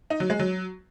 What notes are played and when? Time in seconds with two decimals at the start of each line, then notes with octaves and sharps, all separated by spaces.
0.10 D#4
0.20 F#3
0.30 G#3
0.39 F#3